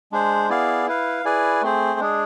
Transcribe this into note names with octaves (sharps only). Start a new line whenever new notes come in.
G#3 D4 G#4 C5
B3 E4 G#4 D5 F5
E4 B4 F5
E4 G#4 B4 D5 G#5
A3 C4 G#4 C5
G#3 D4 G#4